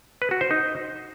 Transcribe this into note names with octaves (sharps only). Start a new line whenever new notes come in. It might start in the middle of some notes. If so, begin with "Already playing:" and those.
B4
F#4
C5
D#4